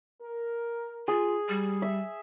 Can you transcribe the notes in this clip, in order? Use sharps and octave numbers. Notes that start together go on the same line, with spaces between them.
A#4
F4 G#4
G3 G4
E5